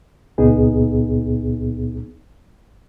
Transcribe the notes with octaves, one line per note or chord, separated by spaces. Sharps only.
C#2 A#2 B3 D#4 G#4